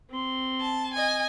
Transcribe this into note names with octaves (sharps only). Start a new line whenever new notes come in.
C4 C6
A5
D#5 G#5